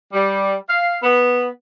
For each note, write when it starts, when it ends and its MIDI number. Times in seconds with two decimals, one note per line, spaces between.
0.13 0.54 55
0.68 0.95 77
1.03 1.46 59